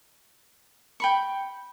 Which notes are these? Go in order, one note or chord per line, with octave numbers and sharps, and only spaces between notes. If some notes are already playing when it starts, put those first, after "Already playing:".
G5 B5 C#6